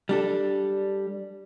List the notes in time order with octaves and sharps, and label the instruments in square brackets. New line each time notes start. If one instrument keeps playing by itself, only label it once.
[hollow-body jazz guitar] G3 D4 A4